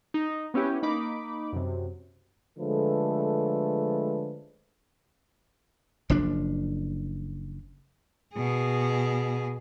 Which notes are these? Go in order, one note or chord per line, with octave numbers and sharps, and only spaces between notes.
D#4
B3 C#4 E4 G4
A#3 D#4 B5 D6
F#2 C3
D3 F3 G#3 A3 A4 B4
F#1 F3 D4
B2 G#4